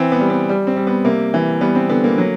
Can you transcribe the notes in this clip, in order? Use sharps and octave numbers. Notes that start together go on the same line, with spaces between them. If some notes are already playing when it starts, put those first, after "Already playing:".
Already playing: E3 C4
B3
G3
B3
G3
C4
G3
B3
C3 A#3
E3
G3 B3
C4
D3 B3
A#3
F#3